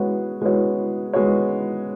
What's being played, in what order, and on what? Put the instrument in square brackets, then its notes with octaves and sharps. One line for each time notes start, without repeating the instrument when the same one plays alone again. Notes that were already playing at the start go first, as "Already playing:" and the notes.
Already playing: [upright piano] G#3 B3 F#4 C#5
G#3 B3 F#4 C#5
G#3 B3 F#4 C#5